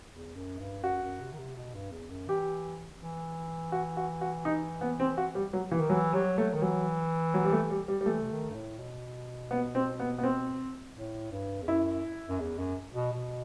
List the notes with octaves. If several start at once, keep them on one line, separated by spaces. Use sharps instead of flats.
E2
F#2
G2
F#2 F#4
F#2
C3
D#3
C3
B2
G2
E2
F#2
E3 G4
E3
F#4
F#4
F#4
D#4
B3
C4
F#4
G3
F#3
E3
D#3
E3 F#3
F#3 G3
F#3 A3
D#3
E3 F#3
F#3
G3
A3
G3
G3
G3
E3 A3
C3
D#3
G2
A2
B2
B3
C4
B3
B3
C4
A2
G2
E2
F#2 E4
F#2
E2
F#2
B2
B2